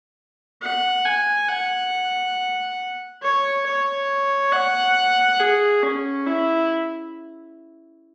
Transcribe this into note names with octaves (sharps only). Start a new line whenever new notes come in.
F#5
G#5
F#5
C#5
C#5
F#5
G#4
C#4
E4